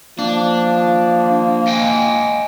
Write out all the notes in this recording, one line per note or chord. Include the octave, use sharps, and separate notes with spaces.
F3 A#3 D4
D#5 G5 G#5